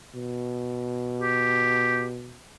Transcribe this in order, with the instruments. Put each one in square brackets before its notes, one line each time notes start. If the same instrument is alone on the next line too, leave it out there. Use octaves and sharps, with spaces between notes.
[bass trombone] B2
[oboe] G4